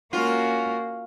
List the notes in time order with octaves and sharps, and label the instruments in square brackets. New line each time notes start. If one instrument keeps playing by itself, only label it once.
[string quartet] A#3 C#4 F#4 [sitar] F4